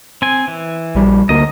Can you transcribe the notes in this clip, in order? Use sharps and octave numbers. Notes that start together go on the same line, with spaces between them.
C4 G#5
E3
A#1 G3
D2 A#3 D#5